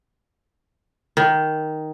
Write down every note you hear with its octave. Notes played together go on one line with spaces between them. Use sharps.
D#3